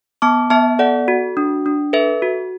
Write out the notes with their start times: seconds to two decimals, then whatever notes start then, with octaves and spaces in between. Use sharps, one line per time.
0.22 B3 A5 D6
0.50 B3 E5 A5
0.79 A4 D5 F#5
1.08 F#4
1.37 D4
1.66 D4
1.93 A4 B4 E5
2.22 F#4